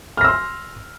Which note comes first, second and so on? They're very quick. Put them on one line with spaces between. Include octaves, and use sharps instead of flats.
F6 A#6 E6 C6